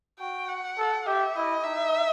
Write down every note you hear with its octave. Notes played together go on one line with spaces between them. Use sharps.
F#4 G5
F#5
A4
G4 E5
E4 D#5
D#4 E5